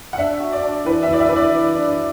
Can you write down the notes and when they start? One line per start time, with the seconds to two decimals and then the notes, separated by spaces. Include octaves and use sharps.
0.13 F#5
0.18 D4 E5
0.40 F#4
0.52 D5
0.63 D4
0.85 E3 B4
1.03 E5
1.09 E3 D5
1.20 E5
1.29 E3 B4
1.36 D5
1.54 E3
1.76 D4